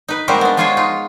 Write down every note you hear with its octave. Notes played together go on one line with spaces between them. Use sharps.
D#4 B4
G3 G#3 A#3 C4 F#4 A#4
B3 D4
F3 G#3 F4 F#4 G#4 C#5
D#4 F4